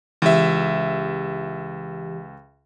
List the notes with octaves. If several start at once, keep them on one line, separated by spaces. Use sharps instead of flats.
C#2 E3 G4 E5